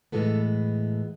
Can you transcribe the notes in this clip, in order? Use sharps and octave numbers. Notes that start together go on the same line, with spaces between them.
A2 E3 G#3 B3 A4